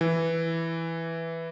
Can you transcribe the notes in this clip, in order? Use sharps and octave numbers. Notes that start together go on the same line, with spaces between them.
E3